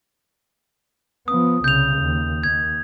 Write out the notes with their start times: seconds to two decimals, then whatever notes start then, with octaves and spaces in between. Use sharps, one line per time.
1.28 F3 B3 D#6
1.64 C2 C#3 G6 F7
2.00 D#2
2.44 D#2 G#6